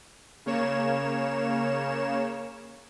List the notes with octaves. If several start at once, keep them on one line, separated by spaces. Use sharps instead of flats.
C#3 A#3 C#5 E7